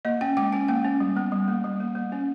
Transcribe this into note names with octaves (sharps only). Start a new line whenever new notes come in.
A#3 D#5
C#4 G5
G#3 G5
C#4 G#5
A#3 G5
C#4
G3
B3
G3
A#3
G3
A#3
A#3
C#4